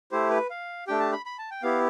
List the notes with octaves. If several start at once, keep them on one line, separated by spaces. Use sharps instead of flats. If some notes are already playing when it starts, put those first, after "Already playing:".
A3 E4 G4 C5
B4
F5
A3 D4 G4 G5
A5
B5
B5
A5
G5
B3 E4 G4 F5